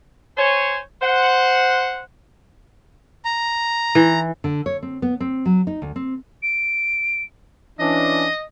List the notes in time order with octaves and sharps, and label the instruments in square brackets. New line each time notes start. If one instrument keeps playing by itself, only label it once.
[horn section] C5 C#5 G#5
C5 F#5
[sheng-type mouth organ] A#5
[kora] E3
[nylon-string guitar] D3
C#5
C4
B3
C4
F#3
D#4
D2
C4
[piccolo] D7
[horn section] E3 C#4 D4 [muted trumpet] D#5